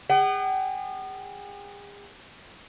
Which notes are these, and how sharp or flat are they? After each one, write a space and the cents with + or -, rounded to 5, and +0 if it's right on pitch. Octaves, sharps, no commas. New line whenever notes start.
G#4 -40 F#5 +45